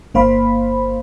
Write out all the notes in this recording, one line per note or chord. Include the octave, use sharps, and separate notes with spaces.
G1 A#3 C5 F5 B5 C6